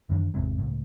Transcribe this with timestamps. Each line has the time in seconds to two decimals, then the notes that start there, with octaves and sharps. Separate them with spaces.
0.09 F#2 D#3 E3 D4
0.34 G#1 E2 C3 G#3
0.58 C#2 A2